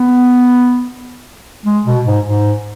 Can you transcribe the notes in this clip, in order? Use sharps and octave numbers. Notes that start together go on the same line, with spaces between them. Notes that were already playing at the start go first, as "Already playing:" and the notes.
Already playing: B3
G#3
B2
G#2
G#2